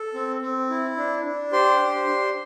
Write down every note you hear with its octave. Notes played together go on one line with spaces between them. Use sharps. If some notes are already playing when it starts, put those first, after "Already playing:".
Already playing: A4
C4
C4
E4
D4
D4
G4 C5 C6
D4
D4